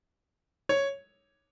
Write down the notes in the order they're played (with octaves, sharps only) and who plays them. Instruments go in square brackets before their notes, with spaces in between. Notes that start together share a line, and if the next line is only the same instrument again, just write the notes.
[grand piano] C#5